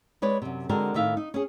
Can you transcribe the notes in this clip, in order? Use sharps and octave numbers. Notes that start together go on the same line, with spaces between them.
G#3 B4 C#5 D5
F#2 C3
D3 G#3 C4 D4 F#4 A#4
A2 D#3 E5 F5
D#4
C#4 G#4